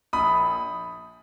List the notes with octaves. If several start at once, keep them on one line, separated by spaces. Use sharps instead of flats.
A#1 B5 D#6